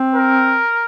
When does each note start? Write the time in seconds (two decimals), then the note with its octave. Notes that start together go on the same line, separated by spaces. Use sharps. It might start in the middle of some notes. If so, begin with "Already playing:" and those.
Already playing: C4
0.15 A#4